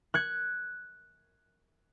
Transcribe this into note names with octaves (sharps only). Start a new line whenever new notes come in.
F#6 G#6 C#7